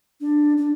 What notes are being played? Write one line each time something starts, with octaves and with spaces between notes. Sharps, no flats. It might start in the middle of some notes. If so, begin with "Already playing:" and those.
D4
D4